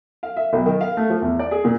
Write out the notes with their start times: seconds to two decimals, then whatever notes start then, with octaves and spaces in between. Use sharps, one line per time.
0.23 F5
0.36 E5
0.53 B1
0.66 D#3
0.81 F5
0.97 A3
1.10 F3
1.22 E2
1.39 D5
1.51 G#4
1.64 A#2